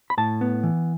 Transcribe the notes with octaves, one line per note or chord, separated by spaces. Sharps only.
B5
A2 A5
B3
E3